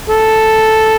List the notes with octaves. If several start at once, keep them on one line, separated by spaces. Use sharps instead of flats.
A4